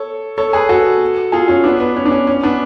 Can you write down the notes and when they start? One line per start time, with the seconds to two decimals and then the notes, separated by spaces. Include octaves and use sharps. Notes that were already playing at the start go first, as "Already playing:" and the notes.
Already playing: A4 C#5
0.38 A4 C#5
0.53 G#4 B4
0.69 F#4 A4
1.32 F4 G#4
1.48 C#4 F4
1.64 B3 D4
1.80 B3
1.96 C#4
2.05 D4
2.12 C#4
2.27 C#4
2.43 B3 D4